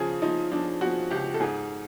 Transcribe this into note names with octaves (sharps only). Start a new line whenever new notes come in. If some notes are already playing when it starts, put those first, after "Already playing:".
Already playing: C#3 F3 G#4
F3 D#4
F3 D4
F3 F#4
C#2 G4
A4
G#2 G#4